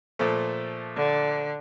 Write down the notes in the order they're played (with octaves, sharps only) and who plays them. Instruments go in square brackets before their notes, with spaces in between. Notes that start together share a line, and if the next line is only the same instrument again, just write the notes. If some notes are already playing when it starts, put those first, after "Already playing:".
[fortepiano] A#2 F3 A3
[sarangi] D3